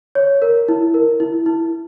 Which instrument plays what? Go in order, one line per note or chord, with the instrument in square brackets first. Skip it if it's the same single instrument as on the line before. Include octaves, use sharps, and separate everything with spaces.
[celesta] C#5
A#4
E4
A#4
E4
E4